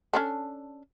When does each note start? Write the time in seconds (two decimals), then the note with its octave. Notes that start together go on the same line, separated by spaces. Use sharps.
0.13 C#4 D4 A4